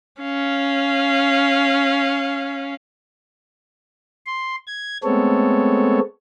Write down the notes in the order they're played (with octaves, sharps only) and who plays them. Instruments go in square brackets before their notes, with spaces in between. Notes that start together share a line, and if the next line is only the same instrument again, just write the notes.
[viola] C#4 F5
[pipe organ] C6
G#6
G#3 A3 B3 C4 A4 C#5